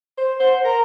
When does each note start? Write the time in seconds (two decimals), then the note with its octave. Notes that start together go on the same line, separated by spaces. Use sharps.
0.18 C5
0.40 C5 F#5
0.64 A#4 A#5